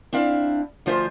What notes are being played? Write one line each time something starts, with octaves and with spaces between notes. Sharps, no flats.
C4 D4 E4 F5
D2 F3 F4 C5 E5